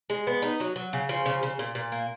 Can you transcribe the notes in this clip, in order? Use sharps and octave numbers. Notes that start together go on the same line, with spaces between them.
G#3
B3
D#4
F#3
F#3
C#3
F3
C#3
C#3
A#2
A#2
A#3